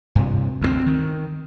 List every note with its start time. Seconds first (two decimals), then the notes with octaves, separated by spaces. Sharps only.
0.15 G2 C3
0.62 D2 G3 C4
0.86 D#3